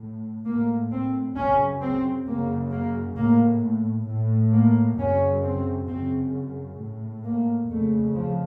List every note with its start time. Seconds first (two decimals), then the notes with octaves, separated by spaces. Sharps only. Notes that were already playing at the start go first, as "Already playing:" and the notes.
Already playing: A2
0.46 A2 A#3
0.91 C4
1.36 F#2 C#3 C#4
1.81 C4
2.26 F#2 C#3 A#3
2.71 A#3
3.17 A2 A#3
4.07 A2
4.53 A#3
4.98 F#2 C#3 C#4
5.43 C4
5.88 F#2 C#3 C4
6.79 A2
7.25 A#3
7.69 F2 C#3 A3
8.15 F3